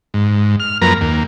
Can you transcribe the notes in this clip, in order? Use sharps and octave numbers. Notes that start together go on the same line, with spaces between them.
G#2
F6
F#2 F3 A#3 A#4 B4 A#5
D#2 A#3